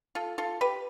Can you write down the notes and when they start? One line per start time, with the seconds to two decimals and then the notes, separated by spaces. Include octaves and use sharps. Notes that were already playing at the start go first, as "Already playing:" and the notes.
0.15 F4 A4
0.38 F4 A4
0.61 G4 B4